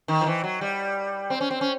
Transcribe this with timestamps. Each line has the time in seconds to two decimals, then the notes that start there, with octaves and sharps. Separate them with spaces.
0.08 D#3
0.21 F3
0.26 E3
0.44 F#3
0.61 G3
1.30 C4
1.41 C#4
1.51 C4
1.61 C#4